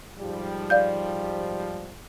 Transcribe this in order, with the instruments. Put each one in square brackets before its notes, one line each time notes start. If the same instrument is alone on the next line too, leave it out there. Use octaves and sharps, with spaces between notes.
[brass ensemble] G#2 F3 G3
[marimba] D5 F5 G6